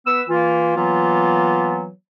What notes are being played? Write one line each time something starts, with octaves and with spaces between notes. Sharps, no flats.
B3 B4 E6
E3 A#3 F4
E3 F#3 A#3 B3 F4